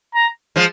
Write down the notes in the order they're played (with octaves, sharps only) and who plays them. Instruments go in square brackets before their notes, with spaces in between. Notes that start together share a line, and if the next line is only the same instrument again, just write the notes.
[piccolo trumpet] A#5
[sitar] F3 G#3